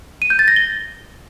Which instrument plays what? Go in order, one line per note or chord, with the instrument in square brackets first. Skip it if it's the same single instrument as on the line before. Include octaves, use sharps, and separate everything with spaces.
[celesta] D#7
G6
A6
A#6
G7